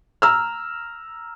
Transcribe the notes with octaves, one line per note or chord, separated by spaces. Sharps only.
A#5 E6 F6